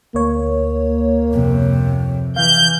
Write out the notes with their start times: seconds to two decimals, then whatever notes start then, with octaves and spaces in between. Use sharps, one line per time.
0.15 D2 A#3 C#5
1.32 F2 C3
2.36 E3 F5 G6